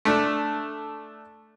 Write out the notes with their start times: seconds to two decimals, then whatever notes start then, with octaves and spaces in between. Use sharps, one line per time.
0.05 A3 D4